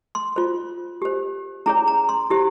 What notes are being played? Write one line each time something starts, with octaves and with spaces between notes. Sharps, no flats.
C6
F4 C5
G4 C5
C#4 E4 G#4 C#5 A#5
A#5
C6
E4 G4 C5